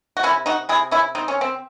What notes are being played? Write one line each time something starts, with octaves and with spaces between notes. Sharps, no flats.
F#4
C3 C#4 E4
D#4 F#4
C3 E4 G#4
C#4 E4
C4 D#4
C#4
C4